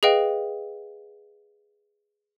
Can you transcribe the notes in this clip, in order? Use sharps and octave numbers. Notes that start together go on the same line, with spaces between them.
G#4 B4 D#5 F5 G5